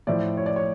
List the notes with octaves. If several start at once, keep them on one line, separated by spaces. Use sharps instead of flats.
A2 F3 D5
C#5
D5
C#5